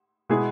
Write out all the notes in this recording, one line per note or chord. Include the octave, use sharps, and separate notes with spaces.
B2 G#3 B3 E4 G#4